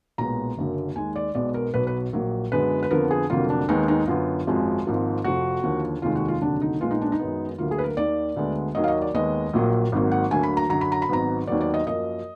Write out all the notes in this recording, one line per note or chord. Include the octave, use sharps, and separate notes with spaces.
B1 A#2 G#3 B3 A#5
F#1 F#2 D3 F#3 A#3
D#2 D#3 G#3 G#5
D5
B1 B2 G#3 B3 D5
A#4
B1 B2 F#3 B3 B4
B4
A#1 A#2 F#3 A#3
F#2 D3 G#3 B3 B4
B4
F2 D3 F3 B3 A#4
G#4
F1 F2 D3 F#3 A#3 F4
D4
D#2 D#3 G#3 B3 D#4
D#4
F#2 D3 F#3 B3 F4
G#1 F#2 F3 G#3
G#1 G#2 F3 A#3
F1 F2 F3 F#4
D#2 D3 F3 A#3
F1 D#2 D#3 G#3 F4
F#4
F4
F1 D#2 D3 F#3 D4
D#4
A#1 A#2 G#3 B3 F4
D#4
D4
D#4
F#2 D#3 G#3 B3
D2 D3 F#3 A#3 F4
G#4
B4
A#4
D#2 D#3 A#3 D5
D2 D3 G#3 B3
D#2 D#3 F#3 A#3 D#5
F5
D#5
D5
D#2 D#3 G#3 B3 D#5
A#1 A#2 F#3 A#3
G#1 G#2 F#3 A#3
F#5
D2 D3 F#3 A#3 G#5
B5
A#5
F#2 D3 F#3 A#5
B5
A#5
B5
G#1 G#2 F#3 B3 A#5
D#2 D#3 F#3 B3 D5
D5
D#5
F#2 F3 A#3 D#5